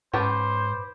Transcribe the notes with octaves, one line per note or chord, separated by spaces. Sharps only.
G#2 C#4 B4 C5 G5 A5 B5 D6